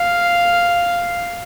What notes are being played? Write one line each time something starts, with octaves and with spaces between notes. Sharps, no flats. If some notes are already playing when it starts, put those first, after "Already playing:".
Already playing: F5